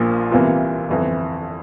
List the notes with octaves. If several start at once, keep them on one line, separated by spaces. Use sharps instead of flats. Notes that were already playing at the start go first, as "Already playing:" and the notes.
Already playing: A#1 A#2 F3 A#3
C2 C3 E3 A#3 F4
G1 F2 E3